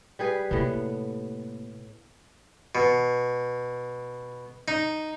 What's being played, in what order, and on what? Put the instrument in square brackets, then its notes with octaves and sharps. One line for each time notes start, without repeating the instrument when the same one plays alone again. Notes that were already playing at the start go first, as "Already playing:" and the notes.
[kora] G3 G#4 B4
[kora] A2 B3 [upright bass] C3 A#3
[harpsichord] B2
D#4